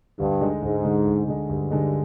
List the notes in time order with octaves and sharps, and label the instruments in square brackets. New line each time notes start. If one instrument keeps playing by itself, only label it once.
[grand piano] D2 [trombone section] G2
[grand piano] D3 G#3 D#4
[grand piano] D2 [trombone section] G#2
[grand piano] D3 G#3 D#4
D2
D3 G#3 D#4
[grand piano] D2 [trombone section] G2
[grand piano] D3 G#3 D#4